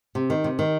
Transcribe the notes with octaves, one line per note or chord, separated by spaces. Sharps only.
C3
D#3
C3
D#3